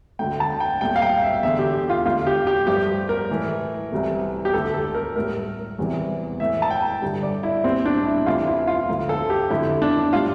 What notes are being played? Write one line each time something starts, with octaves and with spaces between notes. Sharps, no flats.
D2 D3 A3 G5
A5
G5
C2 A#2 A3 G5
F5
G5
E5
E2 D3 A3 E5
G4
G4
F4
D2 D3 A3 F4
G4
G4
G2 F3 A3 G4
A#4
A2 E3 A3
C2 C3 E3 A3
G4
D2 D3 A3 A4
A4
A#4
A2 G3 A#4
E2 C3 E3 G3
A2 E3 A3 E5
A5
G5
G2 D3 G3
D5
E4
C2 A#2 G3 C4
D4
E4
D2 C3 E3 A3 F4
E4
F4
D2 D3 F3
A4
G4
F2 D3 A3 E4
D4
A2 G3 F4